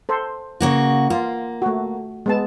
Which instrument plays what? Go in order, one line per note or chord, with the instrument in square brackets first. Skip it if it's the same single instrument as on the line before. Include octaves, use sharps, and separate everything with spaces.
[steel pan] A4 C5
[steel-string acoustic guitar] C#3 A#3 F#4
[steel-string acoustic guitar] A#3 [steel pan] F4
[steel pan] A3 F#4
G#3 B3 A5